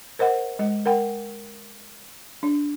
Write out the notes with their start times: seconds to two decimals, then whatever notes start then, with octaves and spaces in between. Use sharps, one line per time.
0.19 A#4 C5 D#5 F#5
0.59 G#3 D#5
0.86 A#4 F#5 G5
2.43 D4